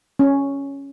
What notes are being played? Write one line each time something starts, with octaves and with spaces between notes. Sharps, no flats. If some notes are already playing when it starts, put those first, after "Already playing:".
C#4